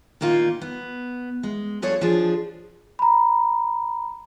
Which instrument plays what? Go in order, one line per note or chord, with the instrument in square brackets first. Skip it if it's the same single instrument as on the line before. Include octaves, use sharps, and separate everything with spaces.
[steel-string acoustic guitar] A#2 D#3 A#3 D#4 F4
B3
G#3
G2 F3 G#4 A4 C#5
F3 D4 G#4
[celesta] A#5 B5